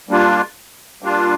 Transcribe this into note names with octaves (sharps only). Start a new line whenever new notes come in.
G3 A#3 D4 F4
G3 A#3 D4 F4